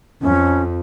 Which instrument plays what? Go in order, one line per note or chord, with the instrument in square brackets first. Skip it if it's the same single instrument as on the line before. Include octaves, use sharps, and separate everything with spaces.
[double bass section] F2 [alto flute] C#4